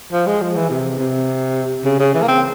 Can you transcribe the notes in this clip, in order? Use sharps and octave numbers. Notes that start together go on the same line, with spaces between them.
F3
G#3
F3
E3
C3
C3
C#3
C#3
E3
A#3
C4